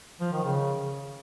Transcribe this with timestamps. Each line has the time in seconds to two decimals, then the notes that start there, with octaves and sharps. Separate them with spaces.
0.21 F3
0.32 D#3
0.44 C#3